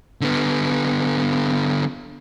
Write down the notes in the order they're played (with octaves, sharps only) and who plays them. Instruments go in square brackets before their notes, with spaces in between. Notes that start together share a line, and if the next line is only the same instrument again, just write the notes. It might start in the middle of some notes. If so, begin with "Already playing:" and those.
[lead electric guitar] D3 B3